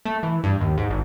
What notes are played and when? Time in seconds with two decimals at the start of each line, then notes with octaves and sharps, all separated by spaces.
0.05 A3
0.23 E3
0.44 G2
0.61 D#2
0.77 G#2
0.90 G#1